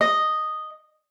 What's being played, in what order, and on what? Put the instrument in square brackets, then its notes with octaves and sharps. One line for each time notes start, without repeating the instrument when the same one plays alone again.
[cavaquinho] D#5